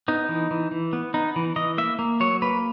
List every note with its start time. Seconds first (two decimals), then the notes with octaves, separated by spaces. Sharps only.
0.08 B3 D#4
0.29 E3
0.51 E3
0.71 E3
0.93 B3
1.14 B3 D#4
1.36 E3
1.56 E3 D#5
1.78 A#3 E5
1.99 A#3
2.20 F#3 C#5
2.42 A#3 B4